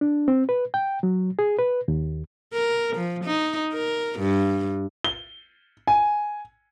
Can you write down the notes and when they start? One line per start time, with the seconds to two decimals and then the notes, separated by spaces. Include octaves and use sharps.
0.01 D4
0.28 C4
0.49 B4
0.74 G5
1.03 F#3
1.39 G#4
1.59 B4
1.88 D#2
2.53 A#4
2.96 F3
3.24 D#4
3.73 A#4
4.20 G2
5.04 G7
5.87 G#5